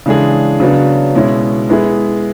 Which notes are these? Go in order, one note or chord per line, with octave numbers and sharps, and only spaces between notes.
C#3 E3 G#3 D4 G#4
C#3 F#3 B3 D4
B2 G#3 C#4 E4
G#3 B3 E4 G#4